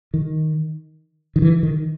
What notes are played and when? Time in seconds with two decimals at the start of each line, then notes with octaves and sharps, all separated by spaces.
0.14 D#3
1.36 D#3
1.42 E3
1.63 D#3